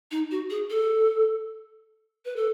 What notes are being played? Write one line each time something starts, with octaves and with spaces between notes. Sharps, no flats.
D#4
F#4
G#4
A4
B4
A4